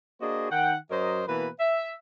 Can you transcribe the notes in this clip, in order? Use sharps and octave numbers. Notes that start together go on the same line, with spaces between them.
A#3 D4 F#4 G#4 C5 D#5
D#3 F#5 G5
F#2 F#3 A#4 C5 D#5
B2 E3 A#3 B4
E5